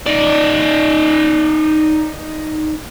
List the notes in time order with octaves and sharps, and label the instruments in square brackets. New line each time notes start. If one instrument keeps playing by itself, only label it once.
[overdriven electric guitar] D#4 D5